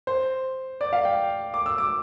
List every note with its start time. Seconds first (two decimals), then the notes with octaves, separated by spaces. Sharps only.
0.07 C5
0.81 D5
0.93 F5
1.05 G5
1.54 D6
1.66 E6
1.78 D6